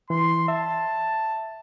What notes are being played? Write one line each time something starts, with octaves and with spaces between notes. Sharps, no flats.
E3 C6
E5 A5